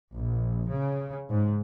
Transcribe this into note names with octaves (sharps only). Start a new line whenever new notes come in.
A#1
C#3
G#2